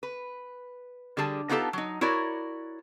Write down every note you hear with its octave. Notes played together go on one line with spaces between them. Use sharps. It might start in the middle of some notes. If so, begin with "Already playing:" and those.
B4
D3 G3 G#4 A5
B3 D#4 F4 G4 A4 A5
F#3 D#4
E4 F#4 A#4 C#5 D5